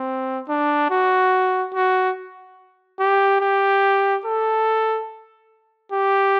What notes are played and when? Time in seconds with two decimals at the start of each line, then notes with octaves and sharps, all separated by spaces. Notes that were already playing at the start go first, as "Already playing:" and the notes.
Already playing: C4
0.49 D4
0.90 F#4
1.74 F#4
2.99 G4
3.41 G4
4.25 A4
5.92 G4